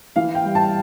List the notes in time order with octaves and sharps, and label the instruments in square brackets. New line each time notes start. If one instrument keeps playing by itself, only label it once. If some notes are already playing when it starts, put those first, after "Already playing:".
[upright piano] E3 F5
G5
G3
A5